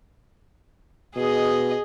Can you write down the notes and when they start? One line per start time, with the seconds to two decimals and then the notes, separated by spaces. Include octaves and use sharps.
1.16 B2 G#4 D#5